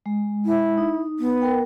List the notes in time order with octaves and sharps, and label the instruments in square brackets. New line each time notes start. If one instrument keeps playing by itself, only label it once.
[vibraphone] G#3
[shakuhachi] E4
[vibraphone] D#4
[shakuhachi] B3
[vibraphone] A#4 G5